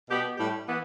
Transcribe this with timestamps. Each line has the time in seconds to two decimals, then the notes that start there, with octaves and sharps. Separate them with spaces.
0.08 B2 B3 G4
0.37 A2 G3 E4 G4
0.68 E3 B3